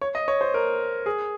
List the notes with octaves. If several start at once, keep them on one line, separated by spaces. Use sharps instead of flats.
C#5
D#5
C#5
C5
A#4
G#4